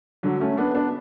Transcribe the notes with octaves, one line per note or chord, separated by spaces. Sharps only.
D3 F#3
A3 C#4
B3 D4
B3 D4